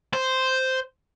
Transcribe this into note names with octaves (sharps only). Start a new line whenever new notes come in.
C5